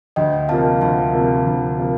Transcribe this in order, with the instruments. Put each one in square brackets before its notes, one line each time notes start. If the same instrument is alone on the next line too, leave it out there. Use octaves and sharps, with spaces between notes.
[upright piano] D2 [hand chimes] D#5 G5
[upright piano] C3 F3 A#3 [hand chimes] F5 A5
[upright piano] D2 [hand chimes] F5 A5
[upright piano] C3 F3 A#3
D2
C3 F3 A#3